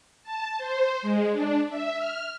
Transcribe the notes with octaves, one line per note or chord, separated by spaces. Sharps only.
A5
C5
G#3
D4
E5
F6